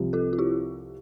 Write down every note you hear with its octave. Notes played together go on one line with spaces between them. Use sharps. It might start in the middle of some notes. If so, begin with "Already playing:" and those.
Already playing: C2 C3 F3
F4 A4
F4
E4 G4